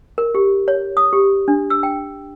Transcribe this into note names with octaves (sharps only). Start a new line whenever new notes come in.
A#4
G4
C#5
D#6
G4
D4
E6
G5